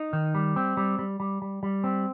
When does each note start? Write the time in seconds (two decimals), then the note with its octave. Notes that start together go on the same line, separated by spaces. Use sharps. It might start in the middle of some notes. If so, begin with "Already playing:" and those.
Already playing: D#4
0.13 D#3
0.35 G3
0.56 C4
0.77 G3
0.99 G3
1.20 G3
1.42 G3
1.63 G3
1.84 C4